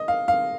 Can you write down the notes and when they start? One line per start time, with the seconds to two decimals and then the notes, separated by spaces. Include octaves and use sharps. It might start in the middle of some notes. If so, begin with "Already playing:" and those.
Already playing: D#5
0.08 F5
0.28 F5